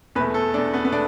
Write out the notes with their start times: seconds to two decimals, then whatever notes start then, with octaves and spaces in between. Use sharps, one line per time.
0.15 E2 B2 A3 B4
0.34 A4
0.54 E2 B2 A3 D4
0.73 B3
0.85 B3
0.91 B2 A3 D4